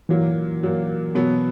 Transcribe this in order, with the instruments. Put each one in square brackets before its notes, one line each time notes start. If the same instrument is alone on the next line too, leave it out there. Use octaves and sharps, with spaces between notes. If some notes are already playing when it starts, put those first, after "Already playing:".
[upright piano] A#2 F#3 A#3 [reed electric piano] E3
[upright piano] A#2 F#3 A#3
B2 F#3 B3